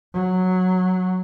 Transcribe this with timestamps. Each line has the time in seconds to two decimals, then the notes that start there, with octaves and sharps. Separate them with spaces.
0.14 F#3